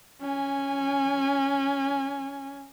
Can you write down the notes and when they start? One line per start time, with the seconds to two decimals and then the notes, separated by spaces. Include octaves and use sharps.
0.21 C#4 G#5